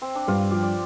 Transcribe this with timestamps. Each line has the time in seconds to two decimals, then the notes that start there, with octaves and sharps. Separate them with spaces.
0.02 C4
0.15 D4
0.28 G2 F4
0.51 F3 G4
0.63 D5